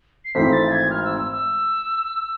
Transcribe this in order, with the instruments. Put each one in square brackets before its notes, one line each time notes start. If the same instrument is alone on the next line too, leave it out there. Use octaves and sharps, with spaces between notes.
[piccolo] C7
[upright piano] G#1 G#2 E3 A3 C4 [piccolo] B6
[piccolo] A6
G#6
F6
E6
E6
E6